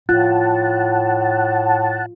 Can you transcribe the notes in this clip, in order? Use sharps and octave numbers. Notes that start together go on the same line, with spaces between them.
A2 F4 F#5 A5